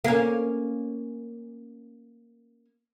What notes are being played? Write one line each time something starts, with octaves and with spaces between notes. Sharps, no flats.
A#3 C#4